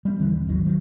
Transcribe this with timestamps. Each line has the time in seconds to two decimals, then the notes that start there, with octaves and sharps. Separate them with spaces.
0.05 G3 C4
0.19 D#1 D2 D3 E3
0.31 D#2
0.47 G#1 D#2 C3 F#3
0.65 D#3 F#3